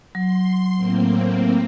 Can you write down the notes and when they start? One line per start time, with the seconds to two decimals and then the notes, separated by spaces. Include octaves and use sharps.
0.15 F#3 C6
0.75 A2 A#3 C4